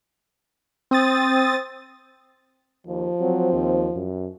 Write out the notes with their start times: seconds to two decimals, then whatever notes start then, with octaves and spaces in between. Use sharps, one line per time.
0.91 C4 D#6 A6
2.87 D#2 F3
3.21 F#3 C4
3.53 D#2
3.96 F#2